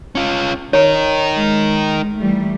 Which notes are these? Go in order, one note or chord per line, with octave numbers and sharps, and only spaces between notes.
C#4 F4
D#4 A#4 C#5
G#3
E3 G3 A3